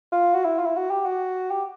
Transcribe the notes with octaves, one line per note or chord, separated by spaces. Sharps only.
F4
F#4
E4
F4
E4
F#4
G4
F#4
G4